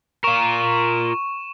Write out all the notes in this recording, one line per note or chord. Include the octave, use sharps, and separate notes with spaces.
F4 A#4 C#6 E7